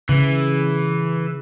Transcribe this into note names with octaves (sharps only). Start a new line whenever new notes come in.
C#3 E3